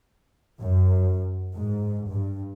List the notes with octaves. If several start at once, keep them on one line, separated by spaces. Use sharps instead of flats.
F#2
G#2
G2